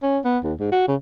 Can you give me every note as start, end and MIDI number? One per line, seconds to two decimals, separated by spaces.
0.03 0.19 61
0.25 0.38 59
0.44 0.54 39
0.60 0.71 44
0.72 0.87 66
0.88 0.96 49